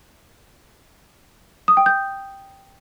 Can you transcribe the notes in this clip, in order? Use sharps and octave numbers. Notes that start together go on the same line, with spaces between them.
D#6
G5
G6